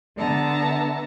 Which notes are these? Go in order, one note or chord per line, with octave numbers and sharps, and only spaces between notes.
D3 B3 E5 A5 A#5